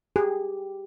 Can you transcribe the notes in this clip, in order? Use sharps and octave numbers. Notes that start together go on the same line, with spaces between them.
G4 G#4